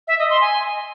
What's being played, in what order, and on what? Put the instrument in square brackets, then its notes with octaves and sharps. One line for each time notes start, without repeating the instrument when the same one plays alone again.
[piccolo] E5
D#5
C6
G#5